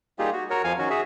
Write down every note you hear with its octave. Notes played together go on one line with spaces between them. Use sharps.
G3 A#3 D#4 F4 G4 G#4
F#4
F#4 A#4 C#5
F2 F3 F5 G#5
D#3 C#4 F#4
F#4 G#4 E5